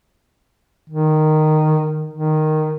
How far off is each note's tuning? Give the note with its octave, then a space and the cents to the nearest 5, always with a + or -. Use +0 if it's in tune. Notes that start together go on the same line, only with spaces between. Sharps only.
D#3 -10
D#3 -5